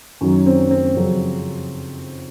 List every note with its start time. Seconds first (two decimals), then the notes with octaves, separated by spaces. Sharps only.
0.21 F#2 D#3 F#3 C#4
0.46 C4
0.71 C4
0.96 F2 C#3 F#3